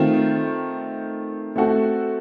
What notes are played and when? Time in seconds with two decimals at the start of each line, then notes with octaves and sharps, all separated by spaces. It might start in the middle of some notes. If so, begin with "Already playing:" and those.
Already playing: D#3 A3 C4 F4
1.56 A3 C4 F#4 A4